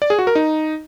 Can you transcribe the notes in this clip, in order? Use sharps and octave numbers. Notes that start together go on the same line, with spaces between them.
D5
G#4
F#4
A#4
D#4